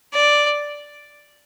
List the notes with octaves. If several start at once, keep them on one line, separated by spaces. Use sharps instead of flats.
D5